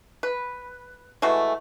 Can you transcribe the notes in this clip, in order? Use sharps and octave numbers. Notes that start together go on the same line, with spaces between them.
B4
E3 G#3 A3 F#4